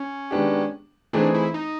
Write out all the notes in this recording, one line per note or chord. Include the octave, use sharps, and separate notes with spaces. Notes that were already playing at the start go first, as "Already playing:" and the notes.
Already playing: C#4
D#3 G#3 B3 D4 G4
E3 A3 C4 D4 D#4 G#4
E4
D#4